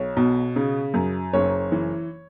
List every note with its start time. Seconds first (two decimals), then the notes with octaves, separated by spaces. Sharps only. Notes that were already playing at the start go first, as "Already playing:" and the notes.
Already playing: B1 C#5
0.17 B2
0.56 C#3
0.94 F#2
1.33 F#1 C#5
1.72 E3